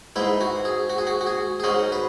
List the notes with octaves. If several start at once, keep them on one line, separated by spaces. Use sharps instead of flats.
G#2 G#3 E4 B4
F#4
G#4
F#4
G#4
F#4
F#4
G#4
G#4
G#2 G#3 C#4 F#4
B4